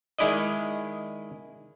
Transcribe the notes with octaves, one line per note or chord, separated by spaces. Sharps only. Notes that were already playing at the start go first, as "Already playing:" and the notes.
D#3 G#3 E4 D5 D#5